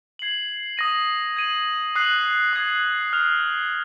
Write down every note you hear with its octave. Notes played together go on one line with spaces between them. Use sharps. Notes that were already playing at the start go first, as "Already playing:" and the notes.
G#6 C7 F#7
D#6 A#6 D#7
G#6 D#7 F#7
D#6 F#6 C7 F#7
D#6 G#6 C7
F6 C7 F7